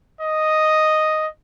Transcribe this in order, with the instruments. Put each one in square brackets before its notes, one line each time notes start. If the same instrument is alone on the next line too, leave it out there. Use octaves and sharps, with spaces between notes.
[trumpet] D#5